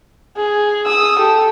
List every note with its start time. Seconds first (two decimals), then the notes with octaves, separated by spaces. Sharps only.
0.37 G#4
0.86 D#6 E6
1.19 G4 A4